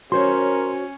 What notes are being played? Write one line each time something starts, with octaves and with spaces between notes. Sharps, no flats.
C#4 F#4 A#4 C5 C#5 C6